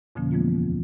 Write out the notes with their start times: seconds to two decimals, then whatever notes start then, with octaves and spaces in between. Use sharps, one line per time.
0.15 F2 B2 D3 F3 A#3 C#4
0.31 E3 F3 G#3 A#3 B3 F4
0.56 D#2